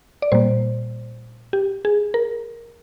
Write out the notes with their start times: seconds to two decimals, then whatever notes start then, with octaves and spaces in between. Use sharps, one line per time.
0.22 D5
0.32 A#2 G3 A#3 C5
1.53 G4
1.85 G#4
2.14 A#4